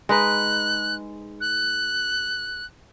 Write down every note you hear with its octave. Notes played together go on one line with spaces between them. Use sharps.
G#3 D#4 B4 F#6
F#6